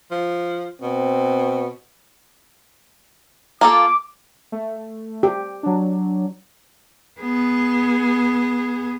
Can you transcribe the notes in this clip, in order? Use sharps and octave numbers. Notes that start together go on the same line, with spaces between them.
F3
B2 C4
A#3 F4 A4 D6
A3
G4
F#3 D4
B3 G#4